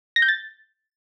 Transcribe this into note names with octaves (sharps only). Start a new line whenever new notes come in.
A#6
G6
A6